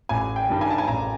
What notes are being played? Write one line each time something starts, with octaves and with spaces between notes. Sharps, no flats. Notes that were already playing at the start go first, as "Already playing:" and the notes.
A1 G#5
G5
G2 D#3 G3
G#5
A5
G#5
A1 A#5